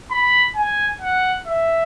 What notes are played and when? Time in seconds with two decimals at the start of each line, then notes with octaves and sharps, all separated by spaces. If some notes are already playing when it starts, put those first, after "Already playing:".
0.11 B5
0.56 G#5
1.01 F#5
1.47 E5